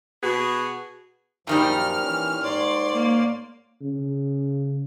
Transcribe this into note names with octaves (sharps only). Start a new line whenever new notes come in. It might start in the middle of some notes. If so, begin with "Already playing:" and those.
B2 B3 F#4 G#4
F#2 A#2 D#3 F3 G3 F6
E3 C#4
G#2 C#5 D5 C6
A#3
C#3